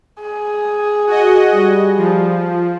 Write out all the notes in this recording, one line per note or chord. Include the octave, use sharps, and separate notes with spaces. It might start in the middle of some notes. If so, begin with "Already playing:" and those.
G#4
F#4 D#5
G3
F3